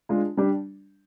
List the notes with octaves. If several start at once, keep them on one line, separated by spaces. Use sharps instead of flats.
G#3 D4 F4
G3 D4 G4